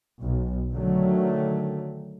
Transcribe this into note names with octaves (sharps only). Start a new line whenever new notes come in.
B1
D3 D#3 F#3 A3